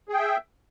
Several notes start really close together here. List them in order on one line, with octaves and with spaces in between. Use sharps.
G#4 G5 E5